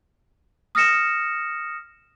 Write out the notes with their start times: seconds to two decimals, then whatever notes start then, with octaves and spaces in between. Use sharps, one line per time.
0.75 D#6 F6 A#6 C#7 E7